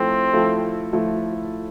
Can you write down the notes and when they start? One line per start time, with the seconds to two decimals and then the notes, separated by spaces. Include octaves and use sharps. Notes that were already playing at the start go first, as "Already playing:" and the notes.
Already playing: F3 A3 C4 E4 A4
0.33 F3 A3 E4 A4
0.93 F3 A3 E4 A4